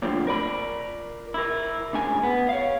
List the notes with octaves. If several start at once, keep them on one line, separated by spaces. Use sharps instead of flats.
A#2 D3 F3 F#3 A3 C4
A#4 D5 B5
E4 A#4
D2 G#2 C#3 G#5
B3
C#5 F5